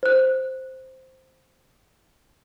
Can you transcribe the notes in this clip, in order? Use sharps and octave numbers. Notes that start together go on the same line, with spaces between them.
C5 F#6